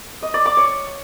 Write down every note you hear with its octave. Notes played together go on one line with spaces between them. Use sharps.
D#5
D5
D6
C#5